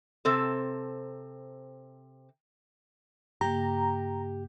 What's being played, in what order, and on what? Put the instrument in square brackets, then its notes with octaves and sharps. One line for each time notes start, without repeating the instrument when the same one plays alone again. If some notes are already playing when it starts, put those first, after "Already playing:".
[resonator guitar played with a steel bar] C3 C4 A4
[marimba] G2 C#3 A#3 [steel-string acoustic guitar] G4 [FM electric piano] A#5